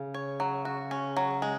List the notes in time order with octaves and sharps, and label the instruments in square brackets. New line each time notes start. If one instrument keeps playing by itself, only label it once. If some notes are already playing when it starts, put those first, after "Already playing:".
Already playing: [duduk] C#3
[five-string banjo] C#5
F#3
F#4
C#4
F#3
G#3